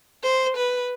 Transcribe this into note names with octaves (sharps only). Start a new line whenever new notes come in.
C5
B4